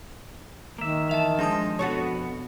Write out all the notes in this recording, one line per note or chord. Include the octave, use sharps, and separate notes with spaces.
D#3 A#3 E5
E3 E5 A5 F7
F3 G#3 D4 D#5 A5 D#6
F2 B2 B3 F#4 A4 C#5